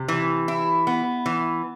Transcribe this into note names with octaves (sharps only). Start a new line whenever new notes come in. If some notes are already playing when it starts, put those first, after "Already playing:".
Already playing: C3
E3
E4
B3
E3